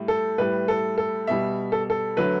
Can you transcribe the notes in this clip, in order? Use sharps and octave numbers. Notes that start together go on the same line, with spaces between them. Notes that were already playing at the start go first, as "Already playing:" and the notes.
Already playing: A2 G3
A4
A2 G3 B4
A4
A4
B2 G3 E5
A4
A4
D3 F#3 A3 B4